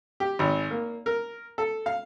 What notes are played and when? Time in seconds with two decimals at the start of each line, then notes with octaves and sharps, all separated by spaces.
0.20 G4
0.39 G#1
0.71 A#3
1.06 A#4
1.58 A4
1.86 F5